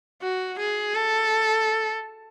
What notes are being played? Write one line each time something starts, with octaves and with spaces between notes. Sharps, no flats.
F#4
G#4
A4